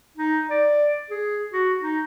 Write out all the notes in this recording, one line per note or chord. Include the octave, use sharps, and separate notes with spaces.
D#4
D5
G#4
F#4
D#4